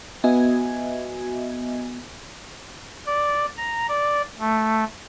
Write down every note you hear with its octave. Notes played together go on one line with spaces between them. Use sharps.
B3 F#4 D#5 E5 G#5 G#6
D5
A#5
D5
A3